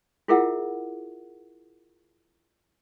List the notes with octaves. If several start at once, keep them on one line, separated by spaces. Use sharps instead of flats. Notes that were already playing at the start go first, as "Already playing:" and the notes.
E4 F4 G#4 A#4 E5 F#5